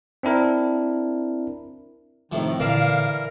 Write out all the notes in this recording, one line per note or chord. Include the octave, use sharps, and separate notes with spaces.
C4 D4 E4 A#4
A2 C3 D#3 F3
A#2 D3 E3 A#4 D5 F5 A5